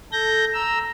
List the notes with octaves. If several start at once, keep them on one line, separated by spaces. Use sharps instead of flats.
A4 G6 A#6
A#5 E6